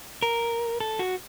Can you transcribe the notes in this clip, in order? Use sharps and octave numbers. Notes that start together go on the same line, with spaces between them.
A#4
A4
F#4